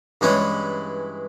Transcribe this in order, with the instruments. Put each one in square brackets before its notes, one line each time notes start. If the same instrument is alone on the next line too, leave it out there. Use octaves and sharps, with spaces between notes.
[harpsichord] G2 E3 G#3 C#4 E4